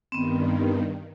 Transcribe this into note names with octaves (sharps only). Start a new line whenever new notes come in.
G2 D#3 B3 C4